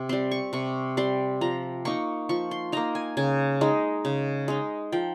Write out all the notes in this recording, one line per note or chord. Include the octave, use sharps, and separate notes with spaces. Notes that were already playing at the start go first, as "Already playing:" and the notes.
Already playing: C3
G3 C4 C6
C#6
C3 C#6
G3 C4 C6
F3 A#5
A#3 D#4 C#6
F3 C#6
C6
A#3 D#4 A#5
G#5
C#3 G#5
G#3 D#4
C#3
G#3 D#4
F3 G5